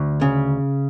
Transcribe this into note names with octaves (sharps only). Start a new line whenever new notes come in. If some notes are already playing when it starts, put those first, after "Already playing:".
Already playing: D2
C#3